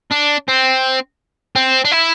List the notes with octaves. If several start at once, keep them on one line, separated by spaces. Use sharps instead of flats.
D4
C4
C4
D4
E4